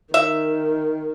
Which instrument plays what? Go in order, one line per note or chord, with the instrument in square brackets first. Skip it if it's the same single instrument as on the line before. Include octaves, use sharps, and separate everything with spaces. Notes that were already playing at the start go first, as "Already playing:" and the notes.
[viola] D#3 [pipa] E5